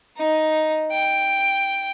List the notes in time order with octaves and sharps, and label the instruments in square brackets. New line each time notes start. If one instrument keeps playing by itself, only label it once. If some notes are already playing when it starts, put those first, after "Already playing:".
[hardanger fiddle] D#4
G5